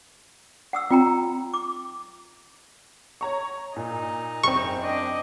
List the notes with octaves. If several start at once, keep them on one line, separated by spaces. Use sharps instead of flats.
F#5 D#6 E6
C4 F4 G5 A#5
D6
C#5 A#5 C#6
A#2 D#4
F#1 C4 C#6
D4 D#5